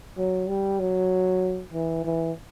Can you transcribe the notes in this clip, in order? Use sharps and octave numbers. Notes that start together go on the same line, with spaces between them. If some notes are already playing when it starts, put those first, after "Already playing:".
F#3
G3
F#3
E3
E3